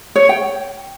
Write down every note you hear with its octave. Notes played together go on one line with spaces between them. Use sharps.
C#5
G5